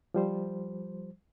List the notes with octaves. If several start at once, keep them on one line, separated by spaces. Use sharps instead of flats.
F3 G3 C5